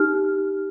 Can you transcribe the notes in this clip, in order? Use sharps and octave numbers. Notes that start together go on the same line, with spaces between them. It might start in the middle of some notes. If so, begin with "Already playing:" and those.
Already playing: D#4 G4 F6